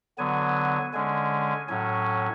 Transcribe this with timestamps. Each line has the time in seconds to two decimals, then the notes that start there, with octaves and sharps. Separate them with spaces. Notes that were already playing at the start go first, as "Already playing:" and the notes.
0.18 D3 F#3 B3 G#5
0.93 D3 G#3 C#4 G#5
1.68 A2 F#3 C#4 G#5